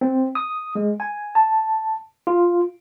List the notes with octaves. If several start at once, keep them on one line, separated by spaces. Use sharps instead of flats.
C4
D#6
G#3
G#5
A5
F4